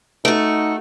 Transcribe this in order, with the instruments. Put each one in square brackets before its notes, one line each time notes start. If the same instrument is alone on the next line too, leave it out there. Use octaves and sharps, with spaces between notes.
[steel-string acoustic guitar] A3 F#4 [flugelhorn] D#4